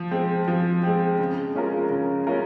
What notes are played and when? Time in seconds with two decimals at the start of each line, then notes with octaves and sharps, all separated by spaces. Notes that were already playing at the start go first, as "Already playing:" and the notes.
Already playing: F3
0.11 G#3 C4
0.48 F3
0.83 G#3 C4
1.19 C#3
1.55 G#3 C#4 F4 A#4
1.90 C#3
2.27 G#3 C#4 F4 A#4